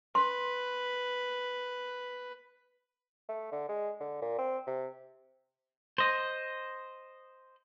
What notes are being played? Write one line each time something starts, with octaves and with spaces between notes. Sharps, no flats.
B4 C6
A3
D3
G#3
D3
A#2
C4
C3
C5 D#5